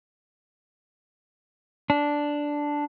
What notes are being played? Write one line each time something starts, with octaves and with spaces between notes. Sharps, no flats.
D4